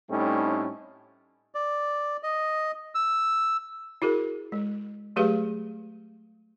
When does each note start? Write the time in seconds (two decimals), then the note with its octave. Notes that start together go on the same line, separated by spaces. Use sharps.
0.10 A2 G3 A3 C4 C#4 D#4
1.55 D5
2.23 D#5
2.95 E6
4.02 E4 F#4 G#4 A#4
4.52 G#3
5.16 F#3 A3 G4 G#4 B4 F5